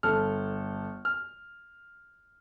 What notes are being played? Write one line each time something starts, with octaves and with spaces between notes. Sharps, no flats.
G1 A4 F6
F6